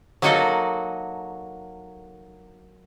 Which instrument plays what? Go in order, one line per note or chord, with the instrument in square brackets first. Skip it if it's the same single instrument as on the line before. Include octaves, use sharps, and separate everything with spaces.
[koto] F#3 A#3 D#4 F#4 A4 D#5